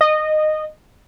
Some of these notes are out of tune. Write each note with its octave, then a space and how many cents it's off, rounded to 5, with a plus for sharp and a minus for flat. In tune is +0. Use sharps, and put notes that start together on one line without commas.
D#5 -15